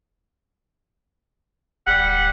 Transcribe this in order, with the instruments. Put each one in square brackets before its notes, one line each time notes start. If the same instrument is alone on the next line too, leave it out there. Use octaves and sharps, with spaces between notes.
[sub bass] D1 [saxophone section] G3 F#5